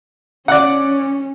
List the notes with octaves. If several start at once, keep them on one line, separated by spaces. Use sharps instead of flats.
C#4 D5 F#5